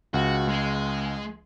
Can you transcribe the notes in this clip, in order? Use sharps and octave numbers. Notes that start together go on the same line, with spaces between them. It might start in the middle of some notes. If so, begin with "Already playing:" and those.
C#2 F#4
G#3